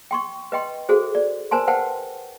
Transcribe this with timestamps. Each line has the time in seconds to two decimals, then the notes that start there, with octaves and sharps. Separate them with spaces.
0.11 G5 C6 C#6
0.52 B4 D#5 G5 C6
0.89 F#4 G#4 A4 C5
1.15 D5
1.51 A#4 C5 G#5 A5 C6
1.67 B4 C5 F#5 G5 A5